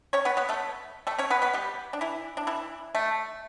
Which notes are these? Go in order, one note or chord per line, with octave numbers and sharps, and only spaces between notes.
C#4 C#5
B3 B4
B3 B4
A3 A4
A3 A4
C#4 C#5
B3 B4
B3 B4
G3 G4
D4
E3 E4
D4
E3 E4
A3